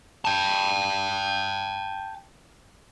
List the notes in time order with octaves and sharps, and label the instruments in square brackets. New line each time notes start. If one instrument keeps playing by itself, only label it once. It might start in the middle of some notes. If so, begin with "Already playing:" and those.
[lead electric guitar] G5 A5